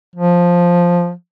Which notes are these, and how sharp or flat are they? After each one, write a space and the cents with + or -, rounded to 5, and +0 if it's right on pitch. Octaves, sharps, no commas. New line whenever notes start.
F3 +5